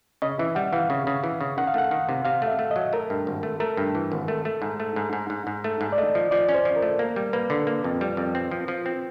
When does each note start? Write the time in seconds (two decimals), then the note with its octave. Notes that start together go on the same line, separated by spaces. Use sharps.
0.22 C#3 D#5
0.39 E3 E5
0.55 G3 F#5
0.73 E3 F5
0.90 C#3
1.07 C#3
1.24 E3
1.41 C#3
1.58 D#3 F#5
1.67 F5
1.74 A3 F#5
1.91 D#3
2.09 C3
2.25 C3 F5
2.42 A3
2.47 E5
2.59 A3
2.71 D#5
2.76 F#3
2.93 A3 A#4
3.10 G2
3.27 G#1
3.43 A3
3.60 A3 A#4
3.77 G2
3.95 E3
4.12 G#1
4.28 A3
4.45 A3
4.62 G#2
4.80 A3
4.96 G#2
5.13 G#2
5.30 G#2
5.47 G#2
5.64 A3
5.81 G#2
5.92 D5
5.98 A3 D#5
6.15 F3
6.31 F3 D5
6.49 C#4
6.54 C5
6.65 F3
6.76 A#4
6.82 A3
6.99 A#3 A#4
7.16 G3
7.33 A#3 B4
7.50 D3
7.67 A#3
7.84 F2
8.01 G3
8.17 F2
8.35 C4
8.51 F3
8.68 F3
8.86 C4